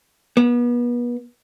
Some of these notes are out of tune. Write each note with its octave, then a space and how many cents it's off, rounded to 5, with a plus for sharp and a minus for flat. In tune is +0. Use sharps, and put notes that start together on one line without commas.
B3 -35